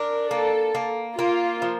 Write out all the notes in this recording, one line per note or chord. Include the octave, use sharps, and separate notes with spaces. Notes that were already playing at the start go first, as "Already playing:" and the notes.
Already playing: D4 A#4
A#3 A4
A#3
A#3 F4
F3